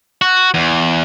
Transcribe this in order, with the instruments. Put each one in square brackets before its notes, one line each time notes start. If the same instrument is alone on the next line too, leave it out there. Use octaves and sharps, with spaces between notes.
[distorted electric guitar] F#4
E2